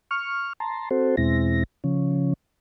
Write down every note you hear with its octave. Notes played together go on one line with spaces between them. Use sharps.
C#6 F6
A5 A#5 C6
C4 F#4 A4 C5
E2 B2 G#3 C4 E4 A#6
C#3 F3 C#4